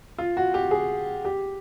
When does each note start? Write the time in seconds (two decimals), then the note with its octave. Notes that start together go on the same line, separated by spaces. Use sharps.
0.18 F4
0.37 F#4
0.54 G4
0.71 G#4
1.25 G4